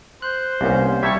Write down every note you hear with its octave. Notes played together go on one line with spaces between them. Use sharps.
C5 F#6
C2 A#3 B3 C#4
G3 C#5 E5 A5 C#6